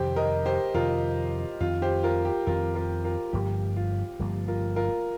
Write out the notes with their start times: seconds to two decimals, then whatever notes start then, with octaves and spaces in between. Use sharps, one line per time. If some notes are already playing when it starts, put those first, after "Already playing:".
Already playing: F2 C3 D#3 G4 C5
0.16 A#4 D#5
0.46 G4 C5
0.74 F2 C3 D#3 F4 A#4
1.60 F2 D#3 C4 F4
1.82 G4 C5
2.03 F4 A#4
2.25 G4
2.47 F2 D#3 C4 F4 A#4
2.75 F4 A#4
3.04 F4 A#4
3.33 G1 G2 F3 A#3 G4
3.76 F4
4.19 G1 G2 F3 A#3
4.48 F4 A#4
4.76 F4 A#4